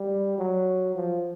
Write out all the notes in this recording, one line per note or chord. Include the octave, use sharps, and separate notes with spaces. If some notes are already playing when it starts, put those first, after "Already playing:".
Already playing: G3
F#3
F3